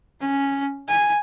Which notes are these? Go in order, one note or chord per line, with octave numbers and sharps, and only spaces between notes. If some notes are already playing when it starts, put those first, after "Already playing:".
C#4
G#5